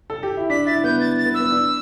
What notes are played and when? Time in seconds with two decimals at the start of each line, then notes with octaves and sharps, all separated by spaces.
0.10 A4
0.23 G4
0.37 E4
0.50 D4 B6
0.66 E4 A6
0.84 B3 G6
1.01 A6
1.18 A6
1.26 B3
1.34 E6
1.40 B3
1.51 D4